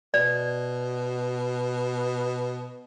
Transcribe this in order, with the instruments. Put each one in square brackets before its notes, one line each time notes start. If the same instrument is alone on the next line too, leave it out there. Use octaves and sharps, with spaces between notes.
[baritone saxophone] B2 [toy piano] D5